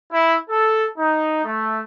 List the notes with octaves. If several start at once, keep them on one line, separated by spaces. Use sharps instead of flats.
E4
A4
D#4
A3